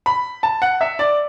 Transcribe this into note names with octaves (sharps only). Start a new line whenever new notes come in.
B5
A5
F#5
E5
D5